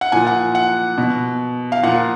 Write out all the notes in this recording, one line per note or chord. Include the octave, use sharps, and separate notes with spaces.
F#5
A#2 F3 G#5
F#5
F#5
B2
F5
A#2 F3 F#5